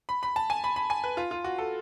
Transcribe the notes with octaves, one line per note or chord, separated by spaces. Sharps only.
B5
B5
A5
G#5
B5
B5
G#5
B4
F4
F4
F#4
A4